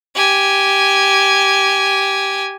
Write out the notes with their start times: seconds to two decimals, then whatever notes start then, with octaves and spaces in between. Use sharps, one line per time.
0.15 G4 G#5